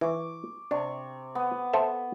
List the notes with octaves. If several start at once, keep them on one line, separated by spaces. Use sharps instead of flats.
E3 C#6 D6
C3 D4 C#6
B3
A4 C5 E5